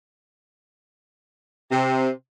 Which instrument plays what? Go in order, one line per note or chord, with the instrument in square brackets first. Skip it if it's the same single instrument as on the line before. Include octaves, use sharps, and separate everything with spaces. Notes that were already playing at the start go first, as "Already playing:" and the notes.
[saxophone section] C3